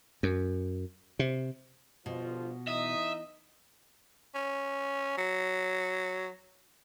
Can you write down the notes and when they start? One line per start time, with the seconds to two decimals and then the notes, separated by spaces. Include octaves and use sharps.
0.23 F#2
1.19 C3
2.06 G1 B2 F3 F4
2.68 E3 D#4 D#5 E5 D#6
4.35 C#4
5.18 F#3